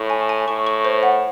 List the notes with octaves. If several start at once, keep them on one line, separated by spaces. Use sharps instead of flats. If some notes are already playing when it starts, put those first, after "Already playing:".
Already playing: A2 C#6
G#5
G#5
A2 C#6
C#6
C5
F#5